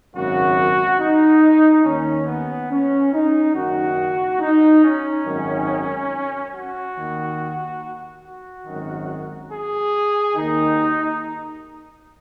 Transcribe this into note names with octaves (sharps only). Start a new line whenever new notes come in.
G#1 F#2 C#3 F#4
D#4
D#2 D#3 C#4
B3
C#4
D#4
F#1 F#2 D#3 F#4
D#4
C#4
G#1 F#2 D#3
F#4
D#2 D#3
F#4
G#1 F#2 D#3
G#4
D#2 D#3 D#4